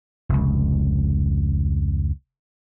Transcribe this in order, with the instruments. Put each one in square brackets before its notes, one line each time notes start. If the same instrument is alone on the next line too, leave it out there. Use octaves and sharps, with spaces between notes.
[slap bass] F1 C#2